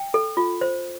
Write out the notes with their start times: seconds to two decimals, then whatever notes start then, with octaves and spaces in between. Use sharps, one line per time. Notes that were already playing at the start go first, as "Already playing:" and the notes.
Already playing: G5
0.14 A4
0.37 F4
0.61 C5